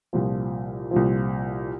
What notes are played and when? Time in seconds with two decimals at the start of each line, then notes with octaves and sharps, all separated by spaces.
0.13 C2 A#2 F3
0.91 C2 A#2 F3